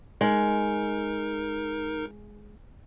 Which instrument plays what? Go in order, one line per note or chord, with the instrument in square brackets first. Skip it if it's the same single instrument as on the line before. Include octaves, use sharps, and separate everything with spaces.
[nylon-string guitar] G#3 [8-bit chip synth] D#4 A#4